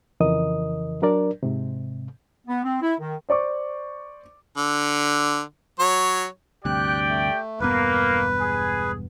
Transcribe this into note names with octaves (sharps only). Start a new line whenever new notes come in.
F2 C#3 E3 A#4 D#5 D#6
F#3 D4 A#4 D5
G#2 C3
B3
C4
E4
D#3
C5 D5 C#6 D6
D3
F#3 C#5
D2 G2 C3 G4 D5 G5 F#6
A3
E1 G2 A#3 B3 B4
G#4